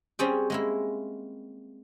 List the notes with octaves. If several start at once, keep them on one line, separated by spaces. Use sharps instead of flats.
G3 C4 C#4 G#4 C5 G5
G#3 A#3 E4